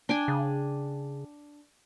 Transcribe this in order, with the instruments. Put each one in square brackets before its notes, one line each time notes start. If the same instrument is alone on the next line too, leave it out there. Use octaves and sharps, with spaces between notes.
[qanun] D4 G5 G#5
[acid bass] C#3